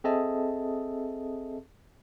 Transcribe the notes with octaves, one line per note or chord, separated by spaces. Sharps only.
C4 G#4 A4 D#5 E5 A5